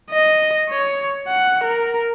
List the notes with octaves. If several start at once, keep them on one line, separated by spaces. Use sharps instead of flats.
D#5
C#5
F#5
A#4